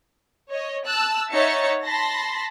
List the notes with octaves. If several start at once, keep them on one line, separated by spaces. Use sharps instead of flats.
C#5 D#5
A5 E6 F#6
D#4 C#5 E5 F#5 A6 C#7
A5 B5 C6 A#6